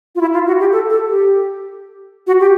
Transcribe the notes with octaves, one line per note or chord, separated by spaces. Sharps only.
F4
E4
F4
F#4
G4
A4
A4
G4
F#4
G4